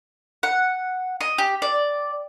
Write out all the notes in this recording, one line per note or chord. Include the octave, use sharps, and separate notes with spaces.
F#5
D#5
G4
D5